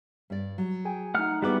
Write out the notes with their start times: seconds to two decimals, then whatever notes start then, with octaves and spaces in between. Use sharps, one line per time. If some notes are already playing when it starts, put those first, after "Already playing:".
0.30 G2 D5
0.58 F#3
0.85 G#4 G5 G#5
1.15 A3 D#4 F#5 F6
1.42 G3 B3 E4 F#4 G#4 F#5 D6